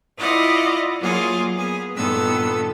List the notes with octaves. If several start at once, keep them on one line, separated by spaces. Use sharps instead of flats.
E4 F4 D5 D#5 F5 F#5
F#3 A#3 F4 G#4
B3 G#4
G2 A#2 D#3 B3 A4 E6